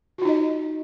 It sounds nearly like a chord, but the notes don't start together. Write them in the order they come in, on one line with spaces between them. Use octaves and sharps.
F#4 F4 D#4 D#5